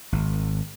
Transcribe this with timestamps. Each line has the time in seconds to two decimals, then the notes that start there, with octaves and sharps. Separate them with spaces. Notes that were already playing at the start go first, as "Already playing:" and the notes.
0.12 G#1